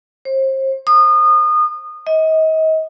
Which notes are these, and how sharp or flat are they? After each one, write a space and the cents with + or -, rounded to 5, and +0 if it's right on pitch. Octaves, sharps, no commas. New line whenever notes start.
C5 +35
D#6 -30
D#5 +35